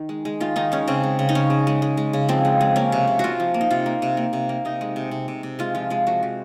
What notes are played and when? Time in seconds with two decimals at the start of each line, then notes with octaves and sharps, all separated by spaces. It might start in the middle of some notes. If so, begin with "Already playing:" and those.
Already playing: D#3 D#4
0.09 G#3
0.25 G#3
0.40 D#3 F4
0.56 D#3 D#4
0.72 G#3 C#4
0.88 C#3 C4
1.03 G#3
1.19 C#3
1.29 D#4
1.35 C#3 C#4
1.50 C#3
1.67 G#3
1.82 G#3
1.97 G#3
2.13 C#3
2.29 F3 C4
2.45 G#3
2.61 G#3
2.76 A#3 C#4
2.92 C3
3.07 C3
3.19 C3 F4 F#4
3.40 F3
3.54 A#3
3.61 D#4
3.71 C3 F4
3.86 A#3
4.02 C3
4.17 A#3
4.33 C3
4.49 A#3
4.65 C3 D#4
4.81 G#3
4.96 C3
5.11 C3
5.28 C3
5.43 C3
5.59 G#3 F4
5.75 F3 F4
5.90 G#3 F4
6.07 F3 F#4
6.23 F3